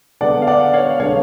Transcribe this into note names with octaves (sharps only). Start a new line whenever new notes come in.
D3 G#3 B3 D4 D5 F#5
F5
D5 F#5
C#5 F5
D3 G#3 B3 D4 C#5 F5